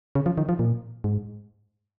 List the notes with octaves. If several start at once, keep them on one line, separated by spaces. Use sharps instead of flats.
C#3
F3
D#3
F3
A#2
G#2